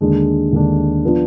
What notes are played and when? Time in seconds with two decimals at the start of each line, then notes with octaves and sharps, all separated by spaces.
0.01 D#2 D3 G#3 D4
0.52 D#2 D3 G#3 D4
1.05 F3 B3 D4 F4